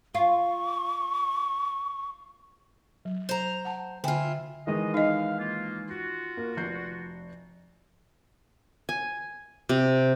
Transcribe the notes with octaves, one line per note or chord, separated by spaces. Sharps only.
F4 C#6
F#3
C5 A#5
F#5 A5
D3 E4 F4 G5 G#5
D#3 E3 G#3 D#5
D#4 D#5 F5
A#3 F4
F4 F#4
A#3
F1 G6 C7
G#5
C3